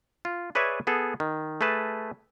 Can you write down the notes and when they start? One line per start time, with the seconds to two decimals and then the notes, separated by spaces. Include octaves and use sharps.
0.25 F4
0.55 G#4 B4 C#5 D5 E5 G#5
0.87 B3 G#4 A4
1.20 D#3
1.61 A3 G#4 B4 A5